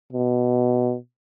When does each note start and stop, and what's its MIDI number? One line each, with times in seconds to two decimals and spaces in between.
0.13 0.96 47